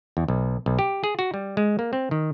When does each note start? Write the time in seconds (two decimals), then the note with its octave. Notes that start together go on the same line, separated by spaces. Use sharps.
0.17 E2
0.28 B1
0.66 B1
0.79 G4
1.04 G#4
1.19 F#4
1.34 G3
1.57 G#3
1.79 A#3
1.93 C4
2.11 D#3